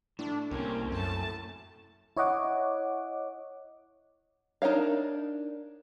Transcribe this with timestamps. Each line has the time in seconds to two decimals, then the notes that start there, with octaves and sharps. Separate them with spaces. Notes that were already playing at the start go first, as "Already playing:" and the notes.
0.19 A2 D4
0.51 C2 A#3 C4 C#4
0.92 F#2 A3 A5
2.16 E4 C#5 D#5 F#5 D6
4.62 D4 D#4 A#4 C#5 F5